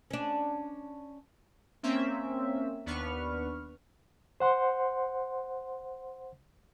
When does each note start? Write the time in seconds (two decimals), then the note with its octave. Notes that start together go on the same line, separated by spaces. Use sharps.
0.11 C#4 D4
1.83 A#3 C4 C#4 E5
2.86 D#2 B3 D4 B4 C#6 F6
4.40 C5 F#5 C6